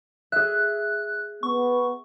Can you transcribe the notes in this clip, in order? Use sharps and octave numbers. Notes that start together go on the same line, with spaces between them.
G#4 E5 F#6
B3 C#6